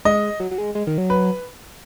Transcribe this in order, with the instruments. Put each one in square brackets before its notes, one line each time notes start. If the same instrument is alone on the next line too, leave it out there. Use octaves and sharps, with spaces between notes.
[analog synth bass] G#3 [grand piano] D#5
[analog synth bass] F#3
F#3
G#3
G#3
D#3
F#3
[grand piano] B4